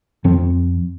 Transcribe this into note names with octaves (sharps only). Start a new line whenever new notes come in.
F2 F3 C4